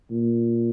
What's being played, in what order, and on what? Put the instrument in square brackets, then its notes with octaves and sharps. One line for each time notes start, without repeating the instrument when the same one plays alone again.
[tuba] A#2